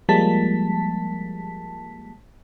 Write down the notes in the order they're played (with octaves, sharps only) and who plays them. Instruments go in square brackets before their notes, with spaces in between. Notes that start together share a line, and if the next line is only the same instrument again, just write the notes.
[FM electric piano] F3 G3 G#3 A#3 A5 B6